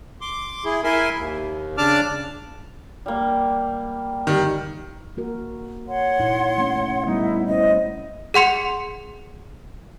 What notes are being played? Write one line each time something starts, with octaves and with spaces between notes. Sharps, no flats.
C6 D6
E4 G#4
E4 A#4 E5 G#5 C6
D#2
C#3 D4 D5 A5 D6 F6
G3 A#3
D#3 G3
A#3 F#4 A#4
C#5 F#5 C6
A#2 D#4 E4
A3 C#4
G3 A3 B3 D#4 E4
C#4 E4 C5 D#5
G#4 F#5 C6 C#7